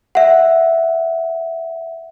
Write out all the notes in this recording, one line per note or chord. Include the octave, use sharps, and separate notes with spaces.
E5 F#5